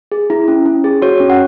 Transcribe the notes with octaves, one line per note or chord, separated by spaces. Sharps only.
G#4
E4
C#4
C#4
G#4
F#4 C#5
C#4
F#5